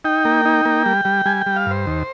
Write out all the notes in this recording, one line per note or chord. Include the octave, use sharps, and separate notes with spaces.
D#4 G5
A#3
D#4
A#3
G3
G3
G3 G#5
G5
G3
F5
G2 C5
D#2